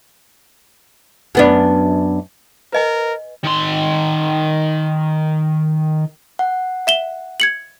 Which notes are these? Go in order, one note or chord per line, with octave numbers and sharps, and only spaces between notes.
F#2 B3 D4
A#4 B4 D#5 G#5
D#3 C6
F#5
E5 E7 G7
G#6 C#7 F#7